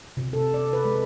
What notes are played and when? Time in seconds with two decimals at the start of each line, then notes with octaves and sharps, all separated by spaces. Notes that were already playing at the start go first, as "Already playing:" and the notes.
0.17 C3
0.33 A4
0.54 D5
0.73 B4
0.85 G#3